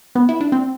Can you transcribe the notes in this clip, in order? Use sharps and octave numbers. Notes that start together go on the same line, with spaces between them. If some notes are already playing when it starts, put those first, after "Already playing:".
B3
E4
D4
C4